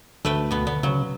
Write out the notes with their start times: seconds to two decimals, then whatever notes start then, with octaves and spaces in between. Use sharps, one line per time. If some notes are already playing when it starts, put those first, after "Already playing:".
0.25 D2 A3 B4 G5
0.51 B2 B3
0.67 D3 B3
0.83 C#3 F#3